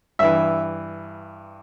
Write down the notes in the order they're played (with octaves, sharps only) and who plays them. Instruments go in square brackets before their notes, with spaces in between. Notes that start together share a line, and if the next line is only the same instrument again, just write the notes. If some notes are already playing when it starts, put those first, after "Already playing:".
[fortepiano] G2 E3 E5